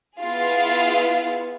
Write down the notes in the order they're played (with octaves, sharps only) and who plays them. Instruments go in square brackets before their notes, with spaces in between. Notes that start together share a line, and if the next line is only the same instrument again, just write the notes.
[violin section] B3 E4 F4 G#4 F5